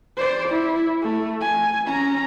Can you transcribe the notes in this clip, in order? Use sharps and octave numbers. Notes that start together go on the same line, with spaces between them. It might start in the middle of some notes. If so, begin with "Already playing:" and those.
C5 D5
E4
A3
G#5
C#4 A#5